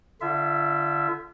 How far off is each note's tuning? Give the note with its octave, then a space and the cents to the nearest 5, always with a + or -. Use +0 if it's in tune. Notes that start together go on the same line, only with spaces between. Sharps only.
D3 +0 F4 -35 E5 +0